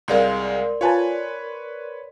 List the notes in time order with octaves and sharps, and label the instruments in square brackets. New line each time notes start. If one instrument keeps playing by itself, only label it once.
[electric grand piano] C2 G#3 F5 [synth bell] A#4 D5 C6
[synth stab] F4 G#5 A5 [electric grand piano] B4 C#5